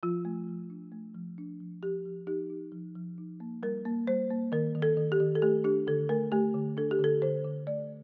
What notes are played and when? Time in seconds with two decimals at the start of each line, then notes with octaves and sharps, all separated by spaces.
0.03 F3 F4
0.25 A3
0.48 F3
0.70 D4
0.92 A3
1.15 F3
1.38 D4
1.60 F3
1.83 F3 G4
2.06 F3
2.27 D#4 G4
2.50 D#4
2.72 F3
2.95 F3
3.18 D#4
3.40 A#3
3.63 G3 A#4
3.85 A#3
4.07 G3 C5
4.30 A#3
4.52 D#3 A#4
4.75 D#3
4.82 A4
4.97 D#3
5.12 G4
5.20 D#3
5.35 A4
5.42 A3 G4
5.64 D4 G4
5.87 D3 A4
6.09 A3 A#4
6.32 A3 G4
6.54 D3
6.77 D4 A4
6.91 G4
6.99 D3 A4
7.22 D3 C5
7.44 D3
7.67 A3 D5